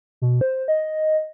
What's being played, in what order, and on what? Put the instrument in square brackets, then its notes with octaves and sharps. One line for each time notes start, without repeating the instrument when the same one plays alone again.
[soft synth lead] B2
C5
D#5